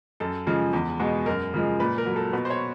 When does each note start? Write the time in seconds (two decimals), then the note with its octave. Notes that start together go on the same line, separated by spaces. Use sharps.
0.20 F#2 A4
0.47 C#3 F3 G#3
0.73 E2
1.00 B2 G#3
1.26 F#2 A#4
1.54 C#3 F3 G#3
1.80 A#2 B4
1.98 A#4
2.06 F#3
2.16 A4
2.33 B2 B4
2.45 C5
2.50 C#5